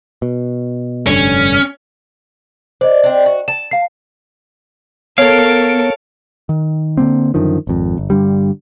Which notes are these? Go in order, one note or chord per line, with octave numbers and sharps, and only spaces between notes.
B2
F1 G2 D3 C#4
D4 C5 D#5
C4 D4
F#4
A5 E7
F5 C7
B3 A4 A#4 C#5 F5 D7
D#3
D3 F3 A#3 C4
F#2 D3 D#3 F3
G#1 F2
G1
G2 D3 G3